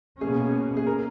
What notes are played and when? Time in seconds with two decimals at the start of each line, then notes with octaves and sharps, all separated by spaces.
0.21 B2 A#3 C#4 G#4
0.77 G#4
0.87 A#4